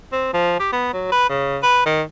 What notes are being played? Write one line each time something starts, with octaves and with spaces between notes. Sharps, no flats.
C4
F3
G4
B3
F#3
B4
C#3
B4
D#3